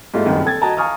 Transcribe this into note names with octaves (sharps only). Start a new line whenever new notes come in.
G#2 G3 A3 A#3 E4 F4
F#1 C2 G2 D#3
A4 G5 G#6 A6
F#4 D#5 G5 A5 A#5
F5 G#5 A#5 C#6 D#6 F6